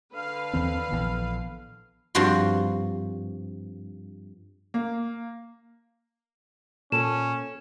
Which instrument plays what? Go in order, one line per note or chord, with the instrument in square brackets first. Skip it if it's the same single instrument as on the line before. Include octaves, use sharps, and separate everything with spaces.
[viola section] D3 B4 F5
[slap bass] D#2 E3 C4
A#1 E3 B3
[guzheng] G2 F3 C4 F#4 C6
[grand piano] A#3
[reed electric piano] A#2 [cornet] C#4 [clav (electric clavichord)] A4 [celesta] E7